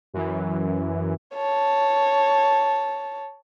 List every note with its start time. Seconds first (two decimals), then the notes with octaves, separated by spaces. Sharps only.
0.14 F#2 E3
1.35 C#5 A5